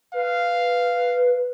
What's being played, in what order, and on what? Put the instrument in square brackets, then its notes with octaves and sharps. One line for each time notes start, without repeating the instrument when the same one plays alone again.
[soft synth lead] B4 [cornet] F5